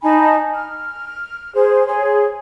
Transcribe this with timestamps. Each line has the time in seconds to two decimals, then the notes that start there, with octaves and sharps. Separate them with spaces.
0.03 D#4 G#5 A5 B5
0.53 F6
1.55 G#4 C5
1.86 G#4 C#5 C6